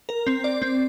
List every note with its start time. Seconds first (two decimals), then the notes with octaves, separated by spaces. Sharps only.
0.09 A#4
0.27 C4
0.44 D5
0.62 C4